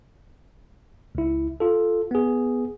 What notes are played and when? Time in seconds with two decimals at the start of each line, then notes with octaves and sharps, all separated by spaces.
1.15 C#2 E4
1.60 F4 A4
2.11 B3 G#4